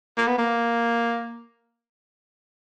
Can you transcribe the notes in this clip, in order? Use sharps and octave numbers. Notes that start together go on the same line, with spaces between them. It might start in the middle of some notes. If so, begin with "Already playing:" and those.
A#3
B3
A#3